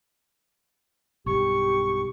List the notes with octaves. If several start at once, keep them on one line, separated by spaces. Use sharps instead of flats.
B1 G2 G4 C#6